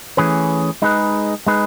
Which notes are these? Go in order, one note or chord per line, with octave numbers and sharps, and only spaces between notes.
E3 A3 C#4 G#4 B4
G#3 D#4 G#4 B4
G#3 D#4 G#4 B4